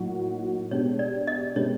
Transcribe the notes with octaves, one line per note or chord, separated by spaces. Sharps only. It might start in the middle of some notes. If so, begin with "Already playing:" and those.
Already playing: A2 F#3 A#3 D#4 F#4
B2 G#3 B3 D4 G4 C#5
D5
D#5
B2 G#3 B3 D4 G4 C#5